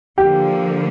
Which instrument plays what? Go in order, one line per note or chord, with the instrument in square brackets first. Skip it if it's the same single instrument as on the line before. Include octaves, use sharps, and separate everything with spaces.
[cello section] D3 F3 A#3 [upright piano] G4